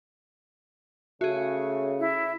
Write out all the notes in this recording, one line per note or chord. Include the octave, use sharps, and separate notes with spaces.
C#3 A3 F#4 G#4
E4 E5